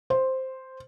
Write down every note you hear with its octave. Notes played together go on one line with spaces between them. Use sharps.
C5